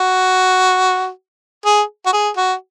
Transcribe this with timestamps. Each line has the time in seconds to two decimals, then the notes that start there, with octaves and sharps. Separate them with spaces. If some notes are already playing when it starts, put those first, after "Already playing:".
Already playing: F#4
1.65 G#4
2.06 F#4
2.13 G#4
2.37 F#4